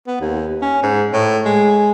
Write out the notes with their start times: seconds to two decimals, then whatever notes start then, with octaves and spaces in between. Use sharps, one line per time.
0.07 B3
0.20 D#2
0.62 C#4
0.83 G#2
1.13 A2
1.46 G#3